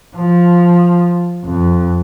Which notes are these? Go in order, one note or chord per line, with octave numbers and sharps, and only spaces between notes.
F3
F2